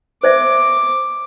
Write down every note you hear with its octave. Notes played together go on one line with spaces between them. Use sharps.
C5 D5 E5 D6